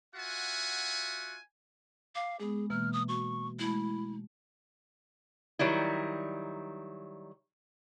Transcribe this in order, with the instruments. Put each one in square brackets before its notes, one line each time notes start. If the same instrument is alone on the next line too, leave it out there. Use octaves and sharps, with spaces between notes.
[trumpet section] F4 F#4 E5 F#5 G#5
[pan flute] F5 [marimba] D6
[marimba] G#3 B3 [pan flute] G#4
[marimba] B2 E3 A#3 [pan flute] F6
[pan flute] D#6
[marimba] F#4 [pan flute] C#6
[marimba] G#3 A3 [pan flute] E4
[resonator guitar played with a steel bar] D#3 F#3 G3 E4